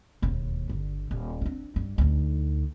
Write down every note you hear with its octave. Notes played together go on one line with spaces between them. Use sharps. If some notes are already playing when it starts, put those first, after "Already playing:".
E1 D#2
G1 D3
D#1
C4 D4
G2
D2 D#4